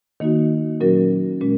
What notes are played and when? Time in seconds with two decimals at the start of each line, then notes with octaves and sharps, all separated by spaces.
0.20 D#3 A#3 D#4 F#4
0.80 A#2 F#3 C#4 F#4 A#4
1.41 A#2 G#3 C#4